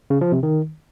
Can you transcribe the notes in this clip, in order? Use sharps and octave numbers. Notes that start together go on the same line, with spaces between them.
C#3
F3
C3
D#3